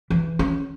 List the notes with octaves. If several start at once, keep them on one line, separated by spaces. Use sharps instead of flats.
E3
C#4